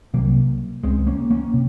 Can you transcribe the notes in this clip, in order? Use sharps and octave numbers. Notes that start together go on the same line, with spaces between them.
C2 C3 F#3 A#3
C#2 C#3 G#3 C4
A#3 C#4
A#3 C#4
C3